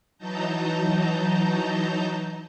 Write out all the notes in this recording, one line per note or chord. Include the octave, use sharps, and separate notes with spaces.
E3 F#3 D#4 A5 A#5 G6